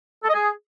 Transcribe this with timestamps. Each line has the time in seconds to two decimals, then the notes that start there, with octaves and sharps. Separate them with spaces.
0.23 A4
0.29 D#5
0.34 G#4